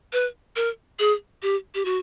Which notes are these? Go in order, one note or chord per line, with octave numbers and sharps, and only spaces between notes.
B4
A#4
G#4
G4
G4
F#4